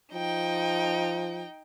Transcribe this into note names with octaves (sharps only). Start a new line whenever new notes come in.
F3 D#4 G5